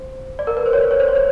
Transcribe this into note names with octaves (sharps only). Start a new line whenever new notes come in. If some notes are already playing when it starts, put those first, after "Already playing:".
Already playing: C5
D5
A#4
B4
C5
C#5
C5
C#5
C5
C#5
C5